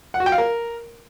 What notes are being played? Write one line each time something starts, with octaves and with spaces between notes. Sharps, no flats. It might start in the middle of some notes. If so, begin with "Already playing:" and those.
F#5
F#4
G5
F5
A#4